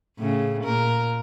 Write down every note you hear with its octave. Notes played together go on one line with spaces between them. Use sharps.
A2 C#3
A#2 A#4